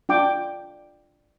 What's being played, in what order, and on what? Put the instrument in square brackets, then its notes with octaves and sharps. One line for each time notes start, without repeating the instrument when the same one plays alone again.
[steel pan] D4 F4 G5 D6